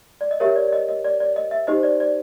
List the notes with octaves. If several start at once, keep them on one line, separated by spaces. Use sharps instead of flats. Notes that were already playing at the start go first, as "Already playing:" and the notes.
D5
D#5
G4 A#4 C#5 E5
D5
D5
D#5
D#5
D5
D5
D#5
E5
D#4 G4 C5 D#5
D5
D5